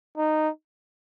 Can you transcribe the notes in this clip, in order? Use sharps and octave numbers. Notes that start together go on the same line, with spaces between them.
D#4